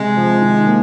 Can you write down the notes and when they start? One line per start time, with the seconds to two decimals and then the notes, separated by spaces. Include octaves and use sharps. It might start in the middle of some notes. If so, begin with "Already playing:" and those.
Already playing: C3 G#3
0.17 F3
0.42 D#3
0.66 A#3